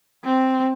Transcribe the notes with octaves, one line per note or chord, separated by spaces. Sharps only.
C4